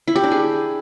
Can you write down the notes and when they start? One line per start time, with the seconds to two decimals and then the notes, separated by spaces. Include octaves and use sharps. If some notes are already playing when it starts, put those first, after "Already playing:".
0.08 E4
0.16 G4
0.24 D4
0.32 G#4